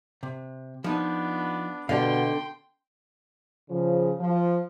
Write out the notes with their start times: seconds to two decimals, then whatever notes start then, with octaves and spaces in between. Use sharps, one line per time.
0.23 C3
0.84 F3 B3 D4 D#4
1.89 B2 D3 G4 D5 F5 G5 C6
3.70 C#3 F3
4.20 F3